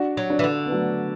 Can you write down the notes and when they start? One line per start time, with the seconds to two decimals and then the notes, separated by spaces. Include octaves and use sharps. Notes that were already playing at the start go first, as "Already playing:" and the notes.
Already playing: D4 F#4
0.17 F#3
0.30 D4 F#4
0.39 E3
0.44 D3
0.66 B3
0.71 F#3 A3